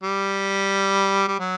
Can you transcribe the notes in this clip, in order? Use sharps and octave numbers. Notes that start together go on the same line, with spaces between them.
G3
G3
F#3